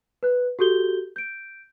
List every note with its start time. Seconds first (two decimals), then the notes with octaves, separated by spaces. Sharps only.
0.23 B4 F#6
0.59 F#4 G4 A4 G6 G7
1.16 G6 D7